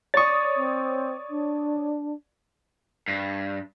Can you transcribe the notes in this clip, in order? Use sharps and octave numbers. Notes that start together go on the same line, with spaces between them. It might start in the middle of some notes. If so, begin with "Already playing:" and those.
C#5 D5 C#6 D#6 A6
C4
D4
G2